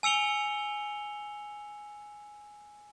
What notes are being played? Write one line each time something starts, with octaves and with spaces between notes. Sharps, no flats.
G#5 E6 C#7 F7 G7